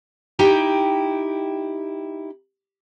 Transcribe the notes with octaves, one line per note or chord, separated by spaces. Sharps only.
D#4 E4 G4 G5